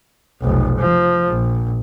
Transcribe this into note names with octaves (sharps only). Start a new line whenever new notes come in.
F1 B1
F3
A#1